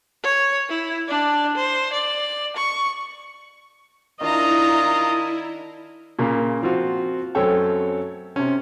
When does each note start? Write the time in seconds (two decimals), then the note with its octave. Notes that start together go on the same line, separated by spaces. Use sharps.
0.23 C#5
0.69 E4
1.08 D4 D5
1.55 C5
1.93 D5
2.57 C#6
4.21 D#3 D4 E4 F4 D#5 A#5
6.19 A#2 C#3 A#3
6.62 F3 C4 F4 F#4
7.35 F#2 A3 C4 A4 C#5 G5
8.36 C3 C#4